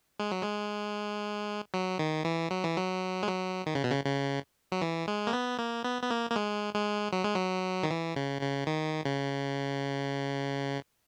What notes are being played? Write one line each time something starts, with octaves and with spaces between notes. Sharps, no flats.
G#3
F#3
G#3
F#3
D#3
E3
F#3
E3
F#3
G#3
F#3
D#3
C#3
B2
C#3
C#3
F#3
E3
G#3
A#3
B3
A#3
B3
B3
A#3
A#3
G#3
G#3
F#3
G#3
F#3
D#3
E3
C#3
C#3
D#3
C#3